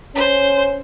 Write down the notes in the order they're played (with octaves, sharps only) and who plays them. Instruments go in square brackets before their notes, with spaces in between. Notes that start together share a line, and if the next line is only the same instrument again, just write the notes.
[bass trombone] C#4 [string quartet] C5